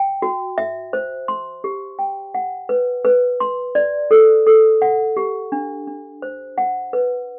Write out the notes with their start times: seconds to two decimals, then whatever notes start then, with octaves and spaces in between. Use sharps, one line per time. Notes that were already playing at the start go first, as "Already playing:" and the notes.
Already playing: G5
0.22 F#4
0.58 E5
0.93 C5
1.28 C6
1.64 G4
1.99 G5
2.35 F#5
2.69 B4
3.05 B4
3.40 C6
3.75 D5
4.11 A4
4.47 A4
4.82 F#5
5.17 G4
5.52 D4
5.87 D4
6.22 C5
6.58 F#5
6.93 B4